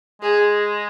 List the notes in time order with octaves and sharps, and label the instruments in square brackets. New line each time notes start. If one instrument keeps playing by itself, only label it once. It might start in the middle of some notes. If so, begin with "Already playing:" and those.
[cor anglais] G#3 [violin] G#4